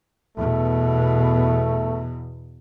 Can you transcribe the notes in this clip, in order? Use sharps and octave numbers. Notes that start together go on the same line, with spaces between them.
E2 B2 A3